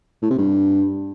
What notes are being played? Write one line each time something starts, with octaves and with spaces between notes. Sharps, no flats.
A2
C3
G2